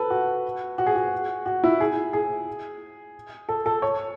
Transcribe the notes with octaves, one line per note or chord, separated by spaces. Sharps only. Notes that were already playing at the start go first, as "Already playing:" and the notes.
Already playing: A4 B4
F#4
F#4
G#4
F#4
F#4
E4
G#4
G#4
A4
A4
C#5